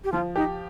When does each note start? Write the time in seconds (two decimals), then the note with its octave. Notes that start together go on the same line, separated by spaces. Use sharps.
0.04 G4
0.12 F3 F4
0.36 D#4 G4